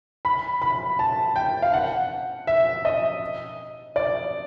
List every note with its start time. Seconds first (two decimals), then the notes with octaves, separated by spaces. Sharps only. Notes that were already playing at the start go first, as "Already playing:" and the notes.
0.25 B5
0.62 B5
0.99 A5
1.36 G5
1.62 F5
1.74 F#5
2.47 E5
2.85 D#5
3.96 D5